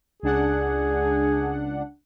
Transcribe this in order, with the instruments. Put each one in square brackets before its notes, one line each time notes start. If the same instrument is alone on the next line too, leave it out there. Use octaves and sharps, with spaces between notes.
[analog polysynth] C#2 D4 F#5 [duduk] G#4